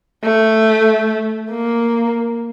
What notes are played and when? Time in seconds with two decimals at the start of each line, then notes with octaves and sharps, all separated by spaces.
0.24 A3
1.51 A#3